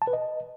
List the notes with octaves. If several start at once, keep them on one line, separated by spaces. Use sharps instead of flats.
A5
B4
D#5